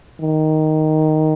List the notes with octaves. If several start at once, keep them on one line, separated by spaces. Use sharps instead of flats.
D#3